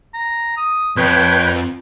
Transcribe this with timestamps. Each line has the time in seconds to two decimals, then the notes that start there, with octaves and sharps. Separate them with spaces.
0.14 A#5
0.57 D#6
0.97 F2 B4 C#5 G5